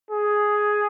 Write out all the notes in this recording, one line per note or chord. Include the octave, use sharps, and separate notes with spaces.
G#4